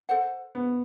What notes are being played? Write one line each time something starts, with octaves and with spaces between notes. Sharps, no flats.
A4 C5 F#5
B3